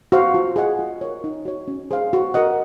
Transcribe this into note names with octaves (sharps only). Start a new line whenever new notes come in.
F#4 C5 F5
F4
G#4 D#5 F#5
F4
A#4 C#5
D#4
F#4 C#5
C#4
G#4 C5 F5
F#4
A#4 D#5 F#5